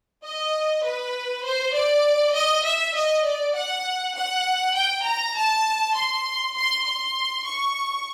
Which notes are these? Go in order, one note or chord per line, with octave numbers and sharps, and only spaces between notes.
D#5
B4
C5
D5
D#5
E5
D#5
D5
F#5
F#5
G5
A#5
A5
C6
C6
C6
C#6